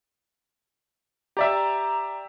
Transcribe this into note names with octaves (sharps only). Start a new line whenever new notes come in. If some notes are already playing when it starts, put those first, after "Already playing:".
G4 D5 E5 A#5